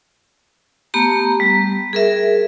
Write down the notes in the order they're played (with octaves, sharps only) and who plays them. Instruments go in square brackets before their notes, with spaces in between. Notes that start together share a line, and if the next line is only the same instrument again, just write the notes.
[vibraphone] A3 B3 G4 A#5
G3
G#4 A#4 E5